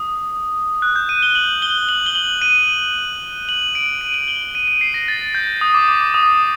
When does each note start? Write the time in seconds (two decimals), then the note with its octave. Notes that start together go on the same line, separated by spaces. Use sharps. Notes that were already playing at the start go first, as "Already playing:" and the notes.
Already playing: D#6
0.82 F#6
0.96 G6
1.09 D#7
1.23 G7
1.35 F#7
1.62 G7
1.89 F#7
2.06 G7
2.15 F#7
2.42 D#7
3.49 F#7
3.75 D7
4.01 D#7
4.14 F#7
4.28 G7
4.42 F#7
4.55 D#7
4.68 D#7
4.81 C7
4.94 A#6
5.08 A6
5.35 G6
5.61 D#6
5.74 D6
5.88 D6
6.01 D6
6.14 D#6